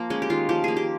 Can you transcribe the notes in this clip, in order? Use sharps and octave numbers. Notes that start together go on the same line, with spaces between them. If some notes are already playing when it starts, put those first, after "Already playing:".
Already playing: F3 A#3
G#3 C#4
G4
D#3 F4
F3 G4
A#3 G#4
G4